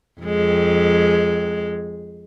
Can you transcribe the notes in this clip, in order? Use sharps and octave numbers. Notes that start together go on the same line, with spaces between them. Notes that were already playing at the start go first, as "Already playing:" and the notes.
F2 G#3